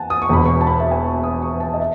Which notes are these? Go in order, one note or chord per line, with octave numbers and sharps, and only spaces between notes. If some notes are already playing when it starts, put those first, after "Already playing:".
Already playing: E2 F#5 G#5 A5
D#6
C#6
E1 E2 B2 B5
C#6
A5
B5
E5
G#5
C#6
D#6
C#6
A5
D#5
E5